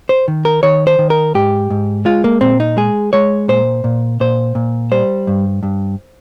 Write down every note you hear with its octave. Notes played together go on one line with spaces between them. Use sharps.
C5
D#3
A#4
D#3 C#5
C5
D#3
A#4
G#2 G4
G#2
G#3 F4
A#3
A#2 C4
D#4
G#3 G#4
G#3 C#5
A#2 C5
A#2
A#2 C5
A#2
G3 C5
G2
G2